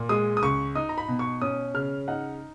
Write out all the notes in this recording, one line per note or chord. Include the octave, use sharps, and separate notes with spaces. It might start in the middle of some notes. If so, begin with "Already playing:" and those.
Already playing: A#2
G#3 D#6
D#6
C#2 C#6
D#4 D#6
A#5
B5
B2
C#6
C#4 D#6
C#3 F6
D#4 F#5